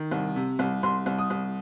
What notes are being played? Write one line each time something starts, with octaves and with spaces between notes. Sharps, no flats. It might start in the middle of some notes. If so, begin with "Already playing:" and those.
Already playing: D#3
C2
C3
C2
C2 C6
C2
D#6
C2